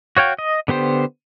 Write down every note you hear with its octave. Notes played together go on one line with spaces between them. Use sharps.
F#4 C#5 F5 G5
D#5
D3 B3 G4 C5